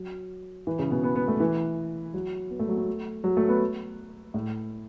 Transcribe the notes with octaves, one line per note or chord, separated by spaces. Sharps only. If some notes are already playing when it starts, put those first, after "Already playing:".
Already playing: F#3
E3
C#3
B2
B3
B3
A3
E3
F#3
B3
A3
F#3
A3
F#3
A3
B3
A2